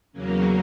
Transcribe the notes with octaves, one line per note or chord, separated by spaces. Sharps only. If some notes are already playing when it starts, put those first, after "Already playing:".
E2 C#3 F#3 A#3 C#4